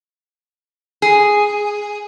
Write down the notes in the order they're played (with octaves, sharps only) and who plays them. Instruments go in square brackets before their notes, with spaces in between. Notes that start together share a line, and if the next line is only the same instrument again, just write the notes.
[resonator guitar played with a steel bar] G#4